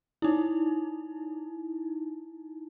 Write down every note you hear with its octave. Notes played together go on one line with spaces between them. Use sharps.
D#4 E4